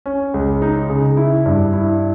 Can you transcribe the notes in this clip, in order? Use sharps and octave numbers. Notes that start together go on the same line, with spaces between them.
C#4
C#2
D#4
C#3
E4
G2
E4